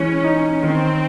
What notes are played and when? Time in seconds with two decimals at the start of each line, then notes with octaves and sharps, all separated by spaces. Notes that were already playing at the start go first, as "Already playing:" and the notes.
Already playing: E3 G#3 C#4
0.24 D#4
0.62 D#3 C4